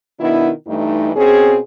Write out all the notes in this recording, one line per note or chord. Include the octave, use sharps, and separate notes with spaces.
B2 D#3 B3 D4 E4
G2 E3 A3 D#4
B2 C4 C#4 G#4